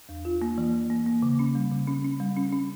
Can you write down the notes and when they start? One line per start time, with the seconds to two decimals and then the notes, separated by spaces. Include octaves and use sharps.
0.09 E2
0.25 F4
0.42 A#3
0.58 E3
0.74 E3
0.90 A#3
1.06 A#3
1.22 C#3
1.39 C#4
1.55 G3
1.71 C#3
1.87 C#4
2.04 C#4
2.20 G3
2.37 C#4
2.52 C#4